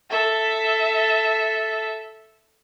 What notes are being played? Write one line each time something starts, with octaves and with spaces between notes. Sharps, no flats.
A4 E5